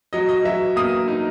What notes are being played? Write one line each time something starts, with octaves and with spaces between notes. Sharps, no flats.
F#3 D#5
D#5
F#3 E5
A#3 D#6
D#4